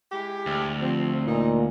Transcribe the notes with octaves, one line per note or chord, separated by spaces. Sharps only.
G#3 E4 G4
D2
F3 C4
A#2 E3 D#4